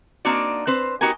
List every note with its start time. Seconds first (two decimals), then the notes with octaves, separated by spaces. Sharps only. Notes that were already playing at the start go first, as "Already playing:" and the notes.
0.25 A#3 C4 D4 D#4 F#4 D5
0.67 C4 B4 C5
1.01 B3 D#4 F#4 G4 A#4 G#5